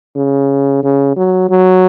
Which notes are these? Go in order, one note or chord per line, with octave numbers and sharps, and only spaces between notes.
C#3
C#3
F#3
F#3